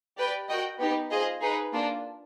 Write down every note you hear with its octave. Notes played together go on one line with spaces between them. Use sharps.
G4 B4 D5 G5
F#4 A#4 D#5 G5
B3 D#4 G4
F4 G#4 C5 D#5
D#4 G#4 B4
A#3 D4 F4